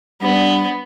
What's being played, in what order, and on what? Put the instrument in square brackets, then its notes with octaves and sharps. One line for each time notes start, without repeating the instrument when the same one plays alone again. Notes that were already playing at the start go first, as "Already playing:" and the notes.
[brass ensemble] G3 D4 [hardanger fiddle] B3